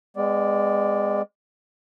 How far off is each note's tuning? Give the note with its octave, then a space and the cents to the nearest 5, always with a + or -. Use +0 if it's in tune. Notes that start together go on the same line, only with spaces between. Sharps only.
G#3 -20 B3 +35 D5 +0